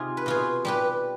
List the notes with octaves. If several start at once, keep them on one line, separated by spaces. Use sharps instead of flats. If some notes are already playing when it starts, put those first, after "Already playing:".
Already playing: C3 D#4 F4 G#4
B4
B2 F4 G#4
G3 G4 B4